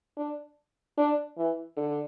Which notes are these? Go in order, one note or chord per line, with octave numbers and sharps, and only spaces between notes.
D4
D4
E3
D3